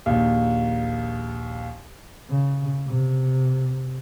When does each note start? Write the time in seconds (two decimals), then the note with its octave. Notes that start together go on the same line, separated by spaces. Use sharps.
0.06 A#1 D#2
2.30 C#3
2.87 C3